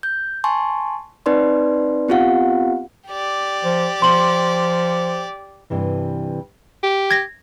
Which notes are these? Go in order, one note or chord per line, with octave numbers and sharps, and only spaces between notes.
G6
G#5 A5 C6 C#6
C4 D#4 B4 D5 C6
B3 C4 F4 G4 F5 F#5
G4 D5
F3
F3 C6 F#7
G2 C3 E3
G4
G#6 A#6